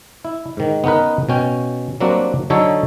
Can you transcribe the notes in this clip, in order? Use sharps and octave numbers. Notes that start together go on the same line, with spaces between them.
E4
G#2 D#3
B3 C#4 D#4 A#4 B4
B2 C#4 G5
F#3 G3 A#3 C4 D4 F#4
D3 F#3 D#4 A4 C#5